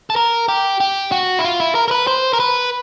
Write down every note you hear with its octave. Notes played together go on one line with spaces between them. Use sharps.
A4
A#4
G4
G4
F#4
E4
F4
E4
A#4
A#4
B4
C5
A#4
B4